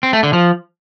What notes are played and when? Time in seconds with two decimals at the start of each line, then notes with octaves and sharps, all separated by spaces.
0.03 C4
0.13 A3
0.23 D3
0.33 F3